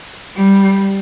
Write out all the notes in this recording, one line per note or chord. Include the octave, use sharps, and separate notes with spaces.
G3